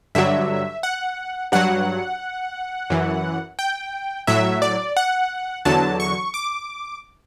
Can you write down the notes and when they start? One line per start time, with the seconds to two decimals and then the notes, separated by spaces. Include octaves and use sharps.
0.15 G2 D3 F#3 E5
0.83 F#5
1.52 G2 F#3 F#5
2.90 F#2 E3
3.59 G5
4.27 A2 F#3 E5
4.62 D5
4.97 F#5
5.65 E2 D3 F#3 A5
6.00 C#6
6.34 D6